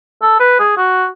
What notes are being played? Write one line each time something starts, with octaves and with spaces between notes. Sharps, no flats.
A4
B4
G#4
F#4